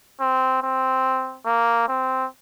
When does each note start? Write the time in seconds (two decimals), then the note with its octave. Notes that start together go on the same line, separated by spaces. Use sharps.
0.21 C4
0.63 C4
1.46 A#3
1.88 C4